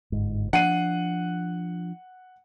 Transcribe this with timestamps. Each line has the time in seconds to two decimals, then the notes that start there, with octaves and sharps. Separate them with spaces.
0.12 G1 G#2
0.53 F3 D4 F#5 C7 D#7